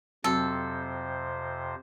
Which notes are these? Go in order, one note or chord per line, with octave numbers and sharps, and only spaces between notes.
F2 C3 F#3 C4 F#4 A4 C5